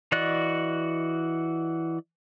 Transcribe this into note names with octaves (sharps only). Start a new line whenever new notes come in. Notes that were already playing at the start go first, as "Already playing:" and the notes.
E3 F#4 D5 D#5 F#6